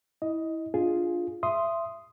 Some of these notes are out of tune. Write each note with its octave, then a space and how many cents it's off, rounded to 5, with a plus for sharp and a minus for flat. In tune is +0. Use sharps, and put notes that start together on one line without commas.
E4 -20 D#5 +10
D4 +0 F4 +0 G#4 +0
E5 +25 C6 +0 D#6 +0